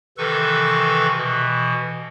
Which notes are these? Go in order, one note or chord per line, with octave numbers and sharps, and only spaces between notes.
C3 D#3 E3 A4 B4 C#6
B2 E3